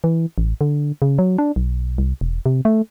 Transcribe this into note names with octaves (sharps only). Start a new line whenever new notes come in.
E3
A1
D3
C#3
F#3
D4
B1
C2
E1
C3
A3